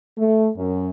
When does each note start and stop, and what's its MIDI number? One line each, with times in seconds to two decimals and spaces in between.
0.17 0.48 57
0.56 0.90 42